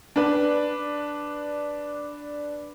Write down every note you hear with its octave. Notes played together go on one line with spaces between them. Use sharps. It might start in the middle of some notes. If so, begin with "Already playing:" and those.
D4 B4 D5